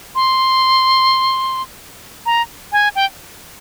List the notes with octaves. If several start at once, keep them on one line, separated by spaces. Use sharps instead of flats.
C6
A#5
G#5
G5